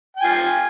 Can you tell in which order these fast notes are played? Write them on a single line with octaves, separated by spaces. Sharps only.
G5 G#5 F4